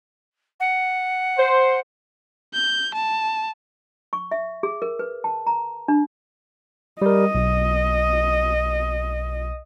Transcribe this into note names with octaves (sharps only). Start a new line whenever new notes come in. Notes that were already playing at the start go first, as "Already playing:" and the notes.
F#5
C5
G6
A5
C#6
E5
G#4
A#4
B4
A5
A#5
D4
G3 A#4 D#5
B1